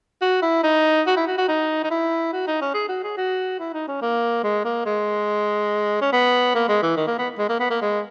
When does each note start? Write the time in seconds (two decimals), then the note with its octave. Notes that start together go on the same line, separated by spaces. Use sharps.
0.22 F#4
0.42 E4
0.64 D#4
1.07 F#4
1.17 E4
1.27 F#4
1.38 F#4
1.49 D#4
1.84 D#4
1.91 E4
2.33 F#4
2.47 D#4
2.61 C#4
2.74 G#4
2.89 F#4
3.03 G#4
3.17 F#4
3.60 E4
3.74 D#4
3.88 C#4
4.02 A#3
4.44 G#3
4.65 A#3
4.86 G#3
6.02 C#4
6.13 B3
6.55 A#3
6.69 G#3
6.83 E3
6.97 D#3
7.07 A#3
7.19 B3
7.39 G#3
7.49 A#3
7.60 B3
7.70 A#3
7.82 G#3